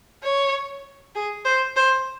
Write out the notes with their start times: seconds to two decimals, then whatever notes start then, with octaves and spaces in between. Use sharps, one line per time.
0.23 C#5
1.15 G#4
1.45 C5
1.76 C5